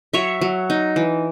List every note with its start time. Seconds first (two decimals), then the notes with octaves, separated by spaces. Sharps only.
0.13 F#3 C#5 E5
0.41 F#3
0.70 D#4
0.96 E3